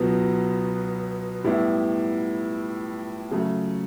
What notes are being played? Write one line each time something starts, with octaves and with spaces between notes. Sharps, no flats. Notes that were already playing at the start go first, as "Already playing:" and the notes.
Already playing: C#2 B2 F#3 B3
A2 G3 B3 E4
C#3 F#3 A3